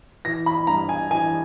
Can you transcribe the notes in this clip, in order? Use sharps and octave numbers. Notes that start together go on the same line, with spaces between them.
E3 A#6
B5
G2 A#5
G#5
E3 G#5